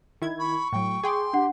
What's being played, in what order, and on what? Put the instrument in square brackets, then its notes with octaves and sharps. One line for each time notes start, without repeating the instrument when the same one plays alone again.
[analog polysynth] D#3 E4 G#6
[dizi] B5 [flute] C#6
[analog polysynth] A2 F#3 [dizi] G5
[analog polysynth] G#4 G5 D6 [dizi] C6
[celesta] D4 F#5 [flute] G4